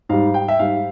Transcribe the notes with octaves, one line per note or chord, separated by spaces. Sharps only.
G#2 G3 F5
G5
E5
G#2 G3 F5